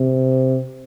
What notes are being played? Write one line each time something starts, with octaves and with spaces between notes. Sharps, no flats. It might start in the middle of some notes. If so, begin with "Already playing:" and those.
Already playing: C3